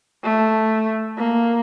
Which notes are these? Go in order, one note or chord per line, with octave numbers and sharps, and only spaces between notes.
A3
A#3